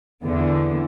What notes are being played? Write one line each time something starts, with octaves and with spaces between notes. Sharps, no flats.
E2 D3